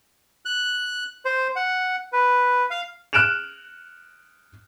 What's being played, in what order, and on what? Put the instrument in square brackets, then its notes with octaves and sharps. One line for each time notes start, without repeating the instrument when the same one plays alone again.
[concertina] F#6
C5
F#5
B4
F5
[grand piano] F6 F#6 D7 E7 F7